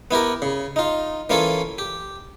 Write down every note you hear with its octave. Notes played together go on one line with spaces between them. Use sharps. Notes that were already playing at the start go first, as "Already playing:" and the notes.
B3 E4 G4 A#4
C#3
D#4 F4
E3 A#3 C#4 F4 A4
G4